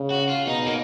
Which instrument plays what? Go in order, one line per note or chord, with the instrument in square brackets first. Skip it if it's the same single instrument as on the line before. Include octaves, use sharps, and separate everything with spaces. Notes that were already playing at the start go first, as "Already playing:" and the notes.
Already playing: [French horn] C#3
[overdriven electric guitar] F#4
F4
[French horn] B2 [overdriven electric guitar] D#4
[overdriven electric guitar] A#3